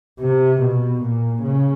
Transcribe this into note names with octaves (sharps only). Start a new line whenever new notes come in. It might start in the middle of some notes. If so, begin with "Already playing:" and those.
C3
B2
A#2
C#3